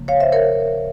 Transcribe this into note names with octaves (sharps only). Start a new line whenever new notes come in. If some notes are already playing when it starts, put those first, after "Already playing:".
Already playing: C#3 F3 A#3
C#5 F5
C5 E5
A#4 C#5